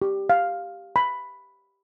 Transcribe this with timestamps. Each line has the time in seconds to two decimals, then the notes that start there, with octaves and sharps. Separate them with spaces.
0.02 G4
0.30 F5
0.96 B5